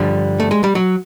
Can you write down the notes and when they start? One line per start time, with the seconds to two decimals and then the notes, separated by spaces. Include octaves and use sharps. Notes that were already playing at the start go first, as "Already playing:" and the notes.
Already playing: G2 D3 F3 G3
0.40 A3
0.51 G#3
0.64 G3
0.75 F#3